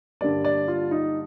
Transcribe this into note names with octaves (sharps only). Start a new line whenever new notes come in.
G2 D3 G3 A#3 D5
D5
F4
D#4